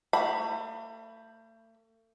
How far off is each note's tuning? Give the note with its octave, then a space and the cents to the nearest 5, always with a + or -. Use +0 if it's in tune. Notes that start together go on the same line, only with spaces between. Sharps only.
A3 +40 B5 +0